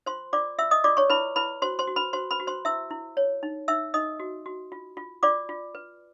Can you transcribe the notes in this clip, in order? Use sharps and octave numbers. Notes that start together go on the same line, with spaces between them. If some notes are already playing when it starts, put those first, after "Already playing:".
F4 C5 C6
F4 D5 D6
F4 E5 E6
D#5 D#6
F4 D5 D6
C#5 C#6
E4 B4 B5
E4 B4 B5
F#4 C5 C6
C5 C6
F#4
B4 B5
F#4 C5 C6
B4 B5
F#4
C5 C6
E4 E5 E6
E4
C#5
D#4
D#4 E5 E6
D#4 D#5 D#6
F#4
F#4
F4
F4
F4 D5 D6
F4
B4